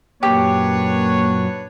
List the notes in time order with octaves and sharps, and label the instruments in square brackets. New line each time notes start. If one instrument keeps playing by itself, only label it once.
[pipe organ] F#2 A#2 F#3 [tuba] A#3 [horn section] D4 B4 C#5 [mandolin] G4